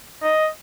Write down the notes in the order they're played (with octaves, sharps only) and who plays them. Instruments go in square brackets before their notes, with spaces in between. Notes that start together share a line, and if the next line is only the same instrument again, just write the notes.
[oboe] D#5